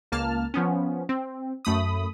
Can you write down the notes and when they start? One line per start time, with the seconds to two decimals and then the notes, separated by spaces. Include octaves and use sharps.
0.12 C#2 A#3 A5 F6
0.54 F3 B3 C#4
1.09 C4
1.65 F#2 A3 B5 D#6